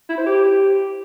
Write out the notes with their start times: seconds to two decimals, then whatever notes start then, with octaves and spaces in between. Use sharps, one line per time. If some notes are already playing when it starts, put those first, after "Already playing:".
0.09 E4
0.18 C5
0.26 G4